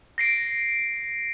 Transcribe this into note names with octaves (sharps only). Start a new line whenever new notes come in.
A#6 C7 D7